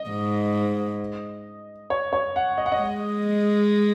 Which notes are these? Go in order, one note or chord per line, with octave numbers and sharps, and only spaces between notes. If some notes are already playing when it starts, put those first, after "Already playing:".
Already playing: D#5
G#2
C#5
C#5
F#5
D#5
F#5
D#5
G#3